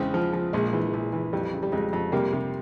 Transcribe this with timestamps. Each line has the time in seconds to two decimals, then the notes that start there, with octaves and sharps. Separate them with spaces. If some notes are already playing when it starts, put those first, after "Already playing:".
Already playing: E2 C#3 G#3 C4
0.14 F3
0.33 F3
0.53 A#1 G#3
0.73 E3
0.93 A#1
1.13 E3
1.33 F2 G3
1.53 C#3
1.63 G3
1.72 F2 G#3
1.93 F2
2.12 C3 G3 A#3
2.32 C3